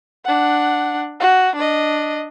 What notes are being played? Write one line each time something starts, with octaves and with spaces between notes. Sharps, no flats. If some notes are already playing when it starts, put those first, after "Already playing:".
D4 F#5
F#4
D4 D#5